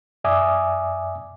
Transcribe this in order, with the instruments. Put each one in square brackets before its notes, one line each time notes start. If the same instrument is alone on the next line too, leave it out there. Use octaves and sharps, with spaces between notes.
[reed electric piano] F#2 D5 E5 G#5 D6 D#6